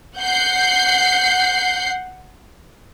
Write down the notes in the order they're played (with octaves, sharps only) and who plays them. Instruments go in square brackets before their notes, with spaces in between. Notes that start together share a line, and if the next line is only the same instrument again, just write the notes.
[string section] F#5 G6 C7